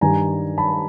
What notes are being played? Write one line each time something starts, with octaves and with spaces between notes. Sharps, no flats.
G2 D#3 G3 G#5 A#5
A5 B5